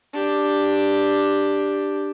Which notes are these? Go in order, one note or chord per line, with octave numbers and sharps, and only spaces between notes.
D4 G4